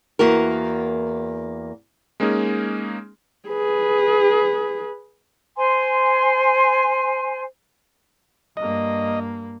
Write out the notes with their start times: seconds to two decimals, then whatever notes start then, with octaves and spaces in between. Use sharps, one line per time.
0.19 E2 A#3 F#4 A#4
2.20 G#3 A#3 C#4 D#4 G#4
3.48 G#4 B4
5.56 C5 G#5 C6
8.57 G2 A#3 D#5